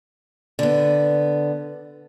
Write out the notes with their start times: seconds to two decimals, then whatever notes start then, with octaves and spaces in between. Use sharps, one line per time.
0.59 D3 B3